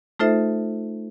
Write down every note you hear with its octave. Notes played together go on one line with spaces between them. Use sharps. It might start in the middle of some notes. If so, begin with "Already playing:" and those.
A3 D#4 F4 A4 C5 E5